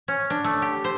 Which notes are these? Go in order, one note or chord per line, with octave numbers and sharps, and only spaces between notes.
C#4
D4
A3
G4
C5